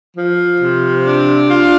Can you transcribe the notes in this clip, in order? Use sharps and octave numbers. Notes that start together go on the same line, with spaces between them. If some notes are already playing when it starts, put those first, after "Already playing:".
F3
C3
D4
F4